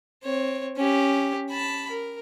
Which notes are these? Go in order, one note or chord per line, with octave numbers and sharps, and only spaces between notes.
C4 C#5
C#4 G4
A5 B5
A#4